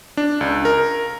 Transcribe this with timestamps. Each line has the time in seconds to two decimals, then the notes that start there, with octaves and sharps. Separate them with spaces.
0.17 D4
0.41 C#2
0.65 A#4